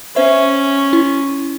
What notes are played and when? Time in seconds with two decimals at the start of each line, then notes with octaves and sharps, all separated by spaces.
0.16 C#4 C5 E5
0.93 E4